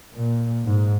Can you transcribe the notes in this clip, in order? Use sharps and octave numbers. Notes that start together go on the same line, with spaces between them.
A#2
G#2